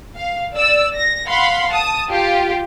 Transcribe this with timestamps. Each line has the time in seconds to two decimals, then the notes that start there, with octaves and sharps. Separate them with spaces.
0.16 F5
0.53 D5 E6
0.94 A#6
1.27 F5 F#5 B5 C6
1.71 A5 D#6
2.09 F4 G4